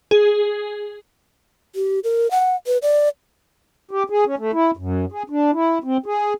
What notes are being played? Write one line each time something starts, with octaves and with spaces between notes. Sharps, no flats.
G#4
G4
A#4
F#5
B4
D5
G4
G#4
C#4
A3
E4
F#2
G#4
D4
E4
C4
G#4